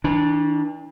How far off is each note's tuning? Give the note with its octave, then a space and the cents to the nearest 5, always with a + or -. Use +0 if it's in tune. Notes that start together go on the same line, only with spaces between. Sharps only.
E3 -45 D4 +0